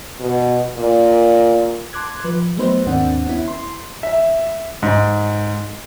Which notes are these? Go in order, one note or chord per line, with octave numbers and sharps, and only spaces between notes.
B2
A#2
A5 C6 D6 F#6 G#6
F3 B4
F#3 A3 B3 D#4 B4 C5
D#2 G#2 C4 D4 F#5
B3 C#4 E4
C6
E5
G#2